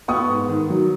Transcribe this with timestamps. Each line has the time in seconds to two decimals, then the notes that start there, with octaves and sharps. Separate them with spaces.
0.08 B3 C#6 D#6
0.29 G#2
0.49 D#3
0.70 F#3